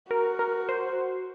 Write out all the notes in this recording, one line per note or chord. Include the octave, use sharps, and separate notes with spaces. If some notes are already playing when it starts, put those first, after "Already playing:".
F#4 A#4
A#4
C5